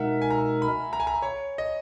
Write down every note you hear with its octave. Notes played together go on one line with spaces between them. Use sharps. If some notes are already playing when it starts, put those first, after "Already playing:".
Already playing: B2 G#3 D#4 A#4 E5 F#5
G#5
A#5
B5
A#5
G#5
A#5
C#5
D#5